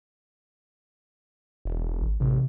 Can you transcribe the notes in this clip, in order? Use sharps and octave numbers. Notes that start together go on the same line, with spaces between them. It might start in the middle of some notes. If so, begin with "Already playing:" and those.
E1
G#1
A1 C3